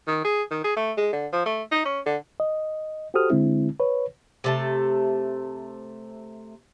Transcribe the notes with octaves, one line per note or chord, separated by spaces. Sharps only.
D#3
G#4
D#3
G#4
A3
G#3
D3
F3
A3
D#4
C#4
D3
D#5
F#4 G4 A4 C5 D#6 F6
D3 G#3 C4 E4
B4 C#5
C3 A3 A5